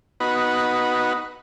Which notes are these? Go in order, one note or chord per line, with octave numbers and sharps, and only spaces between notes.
B3 D#4 F#4 B4